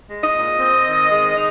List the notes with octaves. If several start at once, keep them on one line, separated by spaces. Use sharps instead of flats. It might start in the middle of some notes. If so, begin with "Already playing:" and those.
G#3
D#5
A#2
C4
D#3
G#3
D#4